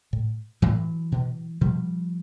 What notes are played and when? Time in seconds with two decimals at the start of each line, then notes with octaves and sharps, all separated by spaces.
0.13 A2
0.62 A2 E3 F#3
1.12 B2
1.61 B2 F3 G3